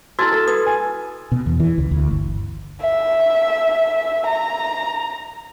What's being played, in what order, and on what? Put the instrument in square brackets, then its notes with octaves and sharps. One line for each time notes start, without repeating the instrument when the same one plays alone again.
[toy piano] E4 F#4 [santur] A4 F5 A5 [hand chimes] E6 G#6 A6
[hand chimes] A4 [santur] E6
[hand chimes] B4 [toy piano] D#6
[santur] G#5
[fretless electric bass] B2
E2
E3
C#2
D2
G1
[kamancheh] E5
A#5